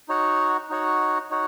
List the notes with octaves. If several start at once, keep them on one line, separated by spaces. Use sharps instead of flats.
D#4 F#4 C#5 F#5
D#4 F#4 C#5 F#5
D#4 F#4 C#5 F#5